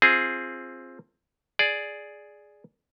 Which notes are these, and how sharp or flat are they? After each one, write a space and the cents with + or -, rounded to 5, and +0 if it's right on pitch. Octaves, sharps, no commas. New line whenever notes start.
C4 +10 F4 -10 G#4 +0
G#4 +5 D5 +0